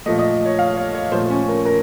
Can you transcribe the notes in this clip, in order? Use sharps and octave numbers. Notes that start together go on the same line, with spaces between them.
A#2 F3 A3 D#5
D#5
C#5
F5
C#5
C#5
A#2 F3 A3 C5
C#4
A#4
A#4